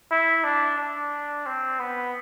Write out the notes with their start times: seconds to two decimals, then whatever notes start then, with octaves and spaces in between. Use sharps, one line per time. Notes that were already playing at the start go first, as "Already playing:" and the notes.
0.11 E4
0.44 D4
0.78 D4
1.46 C4
1.80 B3